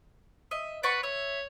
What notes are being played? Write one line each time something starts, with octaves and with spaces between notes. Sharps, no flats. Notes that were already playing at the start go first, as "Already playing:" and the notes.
D#5 E5
B4 D5 F#5 C#6
C#5 E5